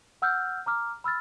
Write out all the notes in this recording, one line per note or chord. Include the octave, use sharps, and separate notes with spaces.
F#5 E6 F6 G6
A#5 D6 F6
B5 E6 F6 A6